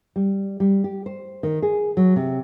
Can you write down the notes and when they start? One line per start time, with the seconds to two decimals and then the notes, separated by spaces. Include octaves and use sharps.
0.16 G3
0.60 G3
0.84 G4
1.06 C5
1.43 D#3
1.62 G#4
1.97 F#3
2.16 C3